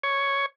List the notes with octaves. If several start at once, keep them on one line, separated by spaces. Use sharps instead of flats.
C#5